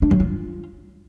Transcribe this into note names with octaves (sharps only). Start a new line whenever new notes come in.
D4
F#3
F4